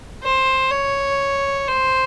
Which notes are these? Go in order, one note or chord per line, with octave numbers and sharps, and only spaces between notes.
C5
C#5
C5